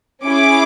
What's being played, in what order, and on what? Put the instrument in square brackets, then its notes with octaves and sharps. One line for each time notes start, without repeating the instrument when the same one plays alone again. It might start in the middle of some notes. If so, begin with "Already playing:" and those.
[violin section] C#4 E4 G#4 D6